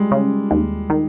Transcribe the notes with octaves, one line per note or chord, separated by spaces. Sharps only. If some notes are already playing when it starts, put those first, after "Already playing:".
Already playing: G3 G#3
C#3
D#2
D#3